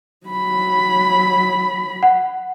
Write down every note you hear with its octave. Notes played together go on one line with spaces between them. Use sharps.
F#3 B5
F#5